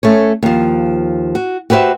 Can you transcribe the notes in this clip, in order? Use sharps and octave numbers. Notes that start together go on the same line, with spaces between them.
A3 C#4 C#5
D#2 F3
F#4
F#4 G4 B4 C5 E5